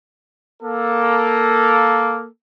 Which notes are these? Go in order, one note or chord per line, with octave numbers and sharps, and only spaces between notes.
A#3 A4